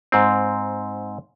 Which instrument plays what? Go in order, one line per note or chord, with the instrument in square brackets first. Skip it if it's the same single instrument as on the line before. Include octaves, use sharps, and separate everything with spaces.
[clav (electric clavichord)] G#2 C4